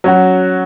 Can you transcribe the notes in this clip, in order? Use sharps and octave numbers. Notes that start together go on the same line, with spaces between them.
F#3 C#4 F#4